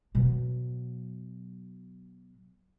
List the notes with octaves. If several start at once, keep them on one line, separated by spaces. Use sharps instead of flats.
B2 F#3